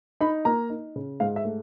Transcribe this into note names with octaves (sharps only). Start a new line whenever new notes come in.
D#4 B5
A#3 A#5
D#4
C#3
G#2 F5
E5
A3